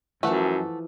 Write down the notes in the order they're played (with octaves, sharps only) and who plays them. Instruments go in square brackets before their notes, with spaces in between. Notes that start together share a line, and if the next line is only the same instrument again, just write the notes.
[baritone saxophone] F#2 [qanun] E3 F3 [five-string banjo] A3 F#5